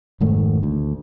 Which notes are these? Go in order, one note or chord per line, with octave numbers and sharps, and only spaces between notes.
F1 G#2 D#3 A3
D2